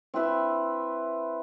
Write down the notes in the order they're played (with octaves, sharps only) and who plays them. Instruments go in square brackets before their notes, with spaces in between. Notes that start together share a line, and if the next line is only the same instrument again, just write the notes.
[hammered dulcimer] C4 E4 B4 E5